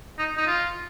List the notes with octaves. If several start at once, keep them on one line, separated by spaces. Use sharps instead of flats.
D#4
D#4
F4